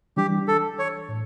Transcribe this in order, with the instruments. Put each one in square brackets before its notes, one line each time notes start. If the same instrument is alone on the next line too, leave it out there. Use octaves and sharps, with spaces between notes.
[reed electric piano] E3 G3 D4 [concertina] G4
[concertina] A4
C#5
[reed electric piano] A2